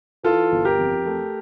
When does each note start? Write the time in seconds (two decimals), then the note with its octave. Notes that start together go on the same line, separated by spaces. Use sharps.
0.23 E3 F4 A4
0.52 G1
0.65 G4 A#4
0.78 F2
1.06 A3